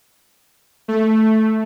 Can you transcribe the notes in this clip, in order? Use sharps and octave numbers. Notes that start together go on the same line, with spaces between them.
A3